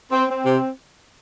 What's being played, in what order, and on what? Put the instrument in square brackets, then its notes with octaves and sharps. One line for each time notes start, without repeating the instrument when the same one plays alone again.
[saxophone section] C4
C4
C3